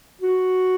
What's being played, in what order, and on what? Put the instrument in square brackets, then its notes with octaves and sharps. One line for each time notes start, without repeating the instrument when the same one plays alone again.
[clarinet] F#4